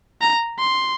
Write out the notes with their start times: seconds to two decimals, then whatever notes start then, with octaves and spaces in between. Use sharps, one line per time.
0.21 A#5
0.59 C6